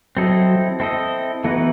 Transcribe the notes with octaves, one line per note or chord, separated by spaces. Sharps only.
F#3 C4 E4 A4 D#5
C4 E4 A4 D#5
E3 A3 B3 D#4 F#4 B4